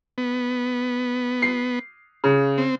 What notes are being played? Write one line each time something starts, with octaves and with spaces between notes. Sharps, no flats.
B3
C7
C#3
C4